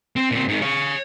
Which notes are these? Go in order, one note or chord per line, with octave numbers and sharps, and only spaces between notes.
C4
A#2 C4
G#2 D#3
C#5 F5